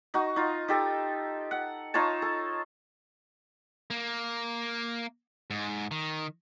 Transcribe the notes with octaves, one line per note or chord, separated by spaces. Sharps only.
D#4 F#4
D#4 F4
D#4 G4 A4
F#5
D#4 F4 C#5 A5
A4
A#3
G#2
D#3